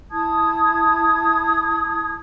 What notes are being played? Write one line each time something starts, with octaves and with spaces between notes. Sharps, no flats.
E4 A5 D#6 G#6